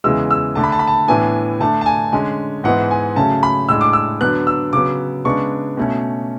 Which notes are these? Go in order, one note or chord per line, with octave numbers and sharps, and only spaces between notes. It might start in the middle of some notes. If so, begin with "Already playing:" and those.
E2 C#3 E3 G#3 E6
E6
D3 A3 D4 A5
B5
A5
B5
A5
A2 E3 B3 D4 G#5
D3 A3 D4 A5
A5
G#5
D3 G#3 C#4 G#5
G#2 E3 G#3 B3 F#5
G#5
C#3 F#3 A3 C#4 A5
B5
A2 G#3 D4 E6
D6
E6
D3 F#3 B3 D4 F#6
E6
C#3 F#3 B3 D6
C#3 G#3 B3 D4 C#6
B2 A3 C#4